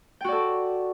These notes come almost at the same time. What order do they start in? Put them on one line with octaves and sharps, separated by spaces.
G5 F#4 D5 A4